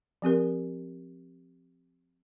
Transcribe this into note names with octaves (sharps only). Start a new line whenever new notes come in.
F3 C4 G4 A#4